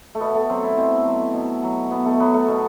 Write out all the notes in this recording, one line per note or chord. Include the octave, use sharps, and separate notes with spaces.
A3
B2 B3
A3
F#3 C4
E4
B2 C4
F#3
B2
F#3
B2 B3
A3
F#3 B3
A3
B2